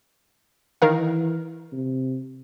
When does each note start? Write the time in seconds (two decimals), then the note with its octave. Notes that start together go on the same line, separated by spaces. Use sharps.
0.82 D#3 E3 A#4 F5
1.72 C3